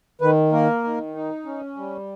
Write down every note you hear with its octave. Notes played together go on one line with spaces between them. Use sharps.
D#3 B4
A#3 A#4
D#3
D#4
C#4
G3